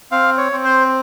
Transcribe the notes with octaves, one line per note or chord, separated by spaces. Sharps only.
C4 F5
C#5
C4
C5